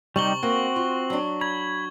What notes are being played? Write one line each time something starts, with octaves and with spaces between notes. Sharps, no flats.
C3 G3 D#4 G4 C#6 F#7 G7
A#3 C4 F#4
F4
F#3 D4
B5 G#6